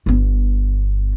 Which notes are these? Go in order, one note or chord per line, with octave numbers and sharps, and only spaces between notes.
G1 B3